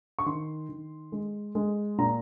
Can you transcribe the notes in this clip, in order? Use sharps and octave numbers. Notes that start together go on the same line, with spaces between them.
C#6
D#3 C6
D#3
G#3
G#3
A#2 A#5